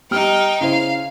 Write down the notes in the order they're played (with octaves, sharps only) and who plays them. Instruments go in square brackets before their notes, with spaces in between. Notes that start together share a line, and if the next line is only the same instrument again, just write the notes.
[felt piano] G3 F6 [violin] D#4 G5
[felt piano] C#3 E4 C5 [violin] F5